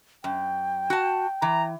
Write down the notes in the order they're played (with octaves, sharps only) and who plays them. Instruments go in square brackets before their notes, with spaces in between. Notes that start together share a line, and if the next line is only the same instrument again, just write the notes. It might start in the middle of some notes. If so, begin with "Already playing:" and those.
[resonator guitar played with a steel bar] F#2 [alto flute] G5
[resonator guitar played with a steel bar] F#4 A5
[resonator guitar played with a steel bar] E3 [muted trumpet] A#5